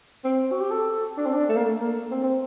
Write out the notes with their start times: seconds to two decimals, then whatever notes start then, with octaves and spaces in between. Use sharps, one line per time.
0.25 C4
0.51 F#4
0.60 G4
0.71 A4
1.18 D4
1.26 C4
1.33 D4
1.49 A3
1.56 A#3
1.64 A3
1.80 A#3
2.11 C4
2.23 C4